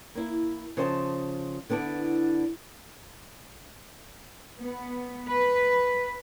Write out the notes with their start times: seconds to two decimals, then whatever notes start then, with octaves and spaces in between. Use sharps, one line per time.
0.15 A#3 E4
0.77 C#3 F3 C5 D#5 E5 A5
1.70 D3 B3 D4 E4
4.59 B3
5.29 B4